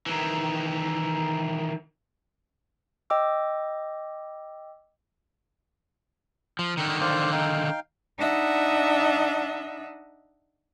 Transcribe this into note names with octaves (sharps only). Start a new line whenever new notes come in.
D#3 E3
D#5 G5 D6 E6
F3
D3 D#3
C5 D5 F5
D#4 F5 G5
D4 D#4 D#5 E5 F#5